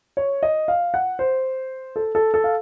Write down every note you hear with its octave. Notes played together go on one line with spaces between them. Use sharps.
C#5
D#5
F5
F#5
C5
A4
A4
A4
F5